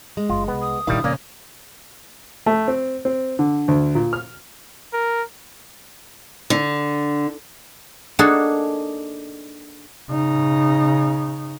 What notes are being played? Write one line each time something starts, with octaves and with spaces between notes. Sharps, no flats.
G#3
F#1 F#2 F4
C2 B3
D#6
A#2 D#3 G3 D4 E4 F5
F2 A#2 C#3 A#3 C#4 D5
A3
C4
C4
D3
D2
A#2
F6
A#4
D3
A#3 D4 D#4 F#4 G#4 A4
C#3 D#4